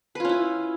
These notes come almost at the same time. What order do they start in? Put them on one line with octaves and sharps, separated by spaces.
B4 F4 C#4 E4